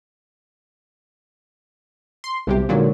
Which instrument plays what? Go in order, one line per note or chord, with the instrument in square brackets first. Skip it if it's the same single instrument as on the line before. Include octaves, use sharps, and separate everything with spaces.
[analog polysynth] C6
[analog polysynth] B1 C3 G4 [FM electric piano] G3 B3 E4
[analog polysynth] A#2 D3 F#3 [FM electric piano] G#3 D#4 F4